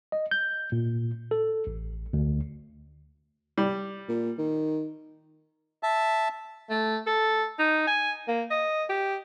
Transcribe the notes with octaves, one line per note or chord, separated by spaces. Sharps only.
D#5
G6
A#2
A4
A1
D2
G3
A#2
D#3
E5 A5
A3
A4
D#4
G#5
A#3
D#5
G4